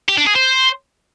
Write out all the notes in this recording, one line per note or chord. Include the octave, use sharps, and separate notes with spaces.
G4
D4
G#4
C5